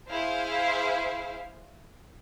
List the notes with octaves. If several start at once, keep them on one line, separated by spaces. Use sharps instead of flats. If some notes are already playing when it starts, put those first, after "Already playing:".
E4 G#4 C5 F5